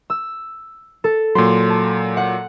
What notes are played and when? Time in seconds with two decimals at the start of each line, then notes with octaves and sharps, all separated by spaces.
0.10 E6
1.04 A4
1.35 A#2 F#3 C6
1.69 A5
2.17 F#5